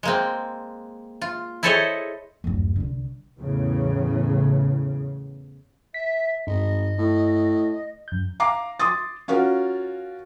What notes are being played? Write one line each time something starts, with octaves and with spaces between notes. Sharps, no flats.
G#3 A#3 C4
F4
E4 G#4 A4 C5 C#5 D#5
D1 F#2
C2 D3
E2 A2 C#3
E5 B6
G#1 G2 D#5
A2
F#2 G6
F5 A#5 D6 C7
C6 D6 D#6 A6
C#4 F4 F#4 A#4